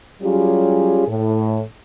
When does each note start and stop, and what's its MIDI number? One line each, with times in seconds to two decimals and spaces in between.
0.22 1.04 54
0.22 1.04 55
0.22 1.04 61
0.22 1.04 65
0.22 1.04 67
0.22 1.04 68
1.07 1.59 45